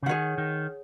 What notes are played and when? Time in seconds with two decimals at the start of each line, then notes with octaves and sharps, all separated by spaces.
0.03 C#3
0.06 D#3 G#4 C#5 F#5
0.38 D#3